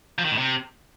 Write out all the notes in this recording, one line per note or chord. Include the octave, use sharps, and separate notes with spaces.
F3
D#3
A2
C3